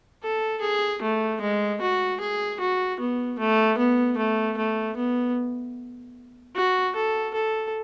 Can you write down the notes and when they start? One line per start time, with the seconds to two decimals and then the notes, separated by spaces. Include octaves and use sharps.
0.23 A4
0.62 G#4
1.02 A3
1.41 G#3
1.81 F#4
2.20 G#4
2.60 F#4
3.00 B3
3.39 A3
3.78 B3
4.17 A3
4.57 A3
4.97 B3
6.56 F#4
6.95 A4
7.34 A4